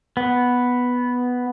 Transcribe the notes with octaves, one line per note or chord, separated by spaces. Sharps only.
B3